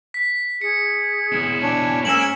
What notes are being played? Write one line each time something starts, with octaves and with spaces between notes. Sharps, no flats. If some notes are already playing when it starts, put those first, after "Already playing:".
B6
G#4 C#7
B1 E4
D4 C#5 G#5
G#2 A#3 C#4 G#5 E6 E7 F#7